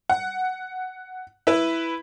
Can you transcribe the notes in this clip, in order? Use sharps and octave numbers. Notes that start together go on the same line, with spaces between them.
F#5
E4 B4